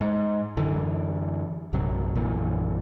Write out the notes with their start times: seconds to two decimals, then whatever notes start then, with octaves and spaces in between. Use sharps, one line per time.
0.01 G#2
0.57 F#2 D3 E3
1.73 A#1 F#2 C3 F#3
2.15 A#1 F#2 A#2 E3